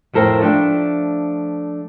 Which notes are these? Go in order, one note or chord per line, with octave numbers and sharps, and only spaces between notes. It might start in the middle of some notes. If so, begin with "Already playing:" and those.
F2 A2 A4 A#4 C5 G5
F3 A3 D4 C5 G5